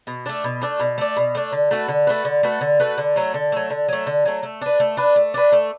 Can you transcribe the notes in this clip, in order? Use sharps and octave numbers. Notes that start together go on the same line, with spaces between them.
B2
A3 D4
B2
A3 D4
B2
A3 D4
B2
A3 D4
D3
A3 F#4 B4
D3
A3 F#4 B4
D3
A3 F#4 B4
D3
A3 F#4 B4
D3
F#3 A3
D3
F#3 A3
D3
F#3 A3
D3
F#3 A3
A3
D4 B4
A3
D4 B4
A3
D4 B4
A3